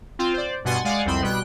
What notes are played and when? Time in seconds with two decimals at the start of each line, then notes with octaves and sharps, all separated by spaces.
0.19 C4 F4
0.34 C5 D5
0.64 G2 B2 F#5 G#5 C6 A6
0.84 G#3 D5 F5 F#5 G#5
1.05 C2 F2 C4 B5 C6
1.22 B2 G3 G5 F#6